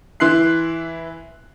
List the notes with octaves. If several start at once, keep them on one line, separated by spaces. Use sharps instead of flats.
E3 E4 C6 F#6 C7